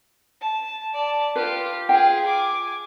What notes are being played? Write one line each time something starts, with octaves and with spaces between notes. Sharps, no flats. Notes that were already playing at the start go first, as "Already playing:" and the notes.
A5
D5 A5
F4 G4 B4
F4 G#4 G5
G#5 D6